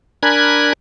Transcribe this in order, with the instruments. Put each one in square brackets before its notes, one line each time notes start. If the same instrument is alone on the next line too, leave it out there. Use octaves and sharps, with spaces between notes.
[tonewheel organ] D4 A#4 G#5 B5 F#6 G#6